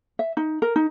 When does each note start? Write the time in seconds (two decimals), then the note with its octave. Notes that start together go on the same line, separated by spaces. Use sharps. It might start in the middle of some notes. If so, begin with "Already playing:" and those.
0.19 E5
0.37 D#4
0.62 A#4
0.76 D#4